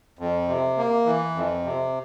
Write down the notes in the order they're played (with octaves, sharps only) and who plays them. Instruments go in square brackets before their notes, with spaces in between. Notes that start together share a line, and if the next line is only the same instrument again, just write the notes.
[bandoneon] F2
C3
A#3
E3
F2
C3